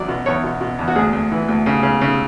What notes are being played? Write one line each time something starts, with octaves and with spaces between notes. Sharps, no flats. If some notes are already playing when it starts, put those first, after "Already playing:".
Already playing: E2 F#3 D5
B2
E2 C#5
B2
B2
E2
F#4
D2 G#4
D2
E3
D2
C#3
C#3
C#3